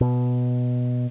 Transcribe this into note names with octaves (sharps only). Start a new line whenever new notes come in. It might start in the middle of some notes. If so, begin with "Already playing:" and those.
B2